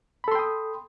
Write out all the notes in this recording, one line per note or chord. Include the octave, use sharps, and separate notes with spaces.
A4 G5 B5 C6 D#6